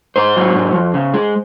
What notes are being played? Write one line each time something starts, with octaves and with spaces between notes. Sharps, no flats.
G#2 C5
F#3
G#2
F2
C#3
G#3